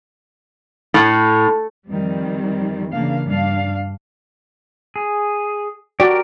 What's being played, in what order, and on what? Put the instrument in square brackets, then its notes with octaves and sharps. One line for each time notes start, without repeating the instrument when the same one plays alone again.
[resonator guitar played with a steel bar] A2
[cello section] F2 D#3 G3 C4
C#3 E3 A#3 D4 F5
G2 D4 F5
[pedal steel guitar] G#4
[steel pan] F#4 D5 [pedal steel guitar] G4 A#4